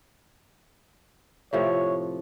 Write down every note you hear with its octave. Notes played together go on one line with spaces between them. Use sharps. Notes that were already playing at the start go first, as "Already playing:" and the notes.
A2 C3 F3 C#5